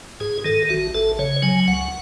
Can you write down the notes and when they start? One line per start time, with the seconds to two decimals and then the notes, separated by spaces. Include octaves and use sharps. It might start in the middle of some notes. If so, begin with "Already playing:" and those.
0.20 G#2 G#4
0.45 D#3 A4
0.69 A1 F#4
0.94 A1 A4
1.19 C#3 C#5
1.42 F#3 G#5
1.68 C#2 F#5